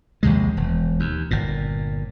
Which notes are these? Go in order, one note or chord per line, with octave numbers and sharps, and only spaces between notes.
A#1 D#2 C3 G#3
E1
D#2
G1 A#2